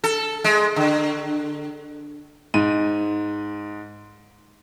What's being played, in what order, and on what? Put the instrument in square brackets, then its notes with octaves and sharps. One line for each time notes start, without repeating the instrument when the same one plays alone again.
[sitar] A4
G#3
D3
[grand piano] G#2 D#7